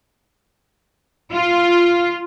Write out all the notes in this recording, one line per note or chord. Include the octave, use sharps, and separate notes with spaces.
F4